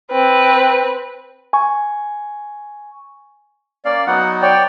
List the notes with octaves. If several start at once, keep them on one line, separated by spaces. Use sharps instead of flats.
C4 B4
G#5 C#6
A#3 C#4 D5 F5
F#3 B3 D#4 F#5
C#5 D5 G5